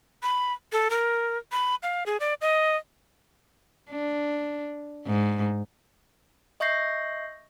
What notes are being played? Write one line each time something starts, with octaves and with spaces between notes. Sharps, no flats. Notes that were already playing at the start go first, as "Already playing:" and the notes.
B5
A4
A#4
B5
F5
G#4
D5
D#5
D4
G#2
D#5 E5 C#6 G6 A#6 C7